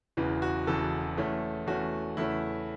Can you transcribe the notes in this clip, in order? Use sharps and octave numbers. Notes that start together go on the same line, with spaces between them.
E1 E2 C#3 E3
F#4
E1 E2 C#3 E3 A4
E2 E3 A3 C#4
E2 E3 A3 C#4 F#4
E2 C#3 A3 C#4 E4